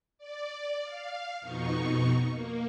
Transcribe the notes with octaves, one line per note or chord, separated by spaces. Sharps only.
D5
F5
F2 B2 D#4 C#6
A#3